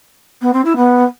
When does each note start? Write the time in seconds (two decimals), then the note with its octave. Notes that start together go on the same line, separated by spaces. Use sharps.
0.41 B3
0.53 C4
0.65 E4
0.77 B3